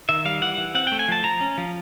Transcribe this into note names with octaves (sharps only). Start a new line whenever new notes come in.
D#3 E5
G3 F5
E3 F#5
E3
C4 F#5
A3 G5
G#5
F3 A5
F3 A#5
C#4
F3